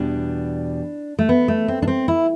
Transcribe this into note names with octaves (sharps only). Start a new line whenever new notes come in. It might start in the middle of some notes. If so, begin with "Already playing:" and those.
Already playing: E2 B2 G3 D4
A3
B3
A3
C4
D4
C4
E4